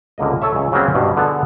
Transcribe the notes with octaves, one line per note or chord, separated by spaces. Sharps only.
C#2 D3 A#3 D#5
A4 C#5 E5
C#2 G#4
C#3 F#3 G3 A#3 C4 C#4
G2 B2
D3 B3 G#4 A4